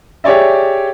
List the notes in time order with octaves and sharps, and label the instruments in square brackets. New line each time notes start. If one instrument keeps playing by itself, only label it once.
[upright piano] G4 G#4 C#5 D5 E5